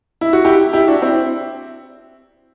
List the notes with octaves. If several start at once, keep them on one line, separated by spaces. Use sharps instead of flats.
E4
F#4
E4 G4
E4 G4
D4 F#4
C4 E4